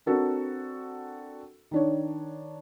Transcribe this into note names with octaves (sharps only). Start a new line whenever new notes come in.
C4 D4 F#4 A4 A#4
D#3 D4 C#5